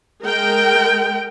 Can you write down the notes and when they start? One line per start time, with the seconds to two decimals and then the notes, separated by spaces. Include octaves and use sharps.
0.23 G#3 A#4 G5